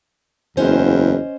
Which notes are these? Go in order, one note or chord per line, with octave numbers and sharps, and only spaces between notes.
F#1 E2 C#4 C5 D#5